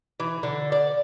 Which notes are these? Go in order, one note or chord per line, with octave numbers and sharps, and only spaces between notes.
E3
D3
D5